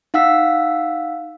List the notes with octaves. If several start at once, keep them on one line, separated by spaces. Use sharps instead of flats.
D#4 F5 F#5 E6 B6